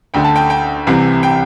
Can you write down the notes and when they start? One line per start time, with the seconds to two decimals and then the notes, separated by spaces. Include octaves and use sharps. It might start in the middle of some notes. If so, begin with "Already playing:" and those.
0.14 D2 D3 G5
0.24 A5
0.36 G5
0.50 G5
0.87 C2 C3 E3
1.23 G5